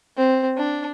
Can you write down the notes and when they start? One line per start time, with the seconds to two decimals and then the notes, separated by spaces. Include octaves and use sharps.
0.17 C4
0.58 D4